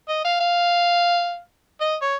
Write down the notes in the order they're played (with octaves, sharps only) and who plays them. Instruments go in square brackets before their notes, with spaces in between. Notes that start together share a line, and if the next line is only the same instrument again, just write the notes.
[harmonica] D#5
F5
F5
D#5
C#5